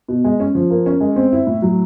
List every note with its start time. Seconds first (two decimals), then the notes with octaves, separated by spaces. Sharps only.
0.08 B2
0.24 G#3
0.40 C#4
0.55 F3
0.70 A#3
0.86 C#4
1.01 G#3
1.16 C4
1.32 E4
1.47 A2
1.62 F#3